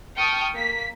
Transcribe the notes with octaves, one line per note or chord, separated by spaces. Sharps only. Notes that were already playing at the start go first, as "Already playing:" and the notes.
G5 A5 C#6 D#6 F6
A#3 B6